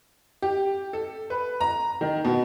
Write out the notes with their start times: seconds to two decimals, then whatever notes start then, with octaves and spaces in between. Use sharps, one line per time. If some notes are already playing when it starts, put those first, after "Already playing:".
0.42 G4
0.93 A4
1.30 B4
1.60 A#5
2.01 D#3
2.25 B2